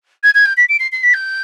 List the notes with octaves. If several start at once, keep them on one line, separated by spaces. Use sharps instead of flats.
G#6
G#6
G6
B6
D7
C7
C7
B6
G6